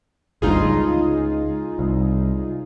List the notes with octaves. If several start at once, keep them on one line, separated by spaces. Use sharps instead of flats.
G#1 D2 G2 D#4 F4 G#4
C#2
C2